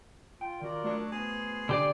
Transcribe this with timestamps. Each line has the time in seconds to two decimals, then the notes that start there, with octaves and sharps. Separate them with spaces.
0.41 F4 G5
0.61 D#3 F4 F#4 A#4 D5
0.84 F#3 A3 D4 F#4
1.12 B3 G#4 C5
1.69 D3 G4 D5